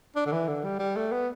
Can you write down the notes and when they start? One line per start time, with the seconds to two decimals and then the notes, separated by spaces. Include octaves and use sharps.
0.16 D4
0.26 D3
0.32 E3
0.47 D3
0.64 G3
0.79 G3
0.96 A3
1.12 B3